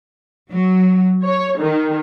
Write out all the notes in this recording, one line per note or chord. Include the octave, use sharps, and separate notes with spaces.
F#3
C#5
D#3